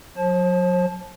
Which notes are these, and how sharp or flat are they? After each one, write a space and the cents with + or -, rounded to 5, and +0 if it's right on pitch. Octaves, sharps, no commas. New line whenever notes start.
F#3 -30 C5 +40 A5 -20